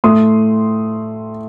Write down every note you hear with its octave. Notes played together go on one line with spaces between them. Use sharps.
A2 A3 C6 D#6